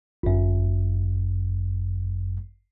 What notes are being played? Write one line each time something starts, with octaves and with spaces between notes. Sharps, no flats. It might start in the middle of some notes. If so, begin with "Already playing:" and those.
G1 F#2